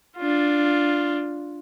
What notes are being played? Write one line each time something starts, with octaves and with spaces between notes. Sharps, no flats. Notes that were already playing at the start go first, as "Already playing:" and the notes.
D4 F4